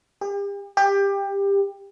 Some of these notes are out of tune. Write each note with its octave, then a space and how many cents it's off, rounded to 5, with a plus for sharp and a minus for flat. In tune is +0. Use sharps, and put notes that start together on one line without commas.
G4 +40
G4 +20